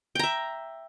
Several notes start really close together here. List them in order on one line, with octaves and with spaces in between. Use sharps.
G5 A#5 E5